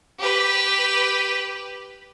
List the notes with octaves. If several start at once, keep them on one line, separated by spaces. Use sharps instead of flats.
G4 B4